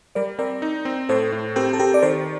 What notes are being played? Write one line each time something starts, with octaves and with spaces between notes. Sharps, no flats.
G3 A#4 D5
C4 A#4 D5
D#4
C4
A2 A4 C5
A2
C4 G4 A#4
A4
C4 G4 A#4
D5
D#3 A4 C5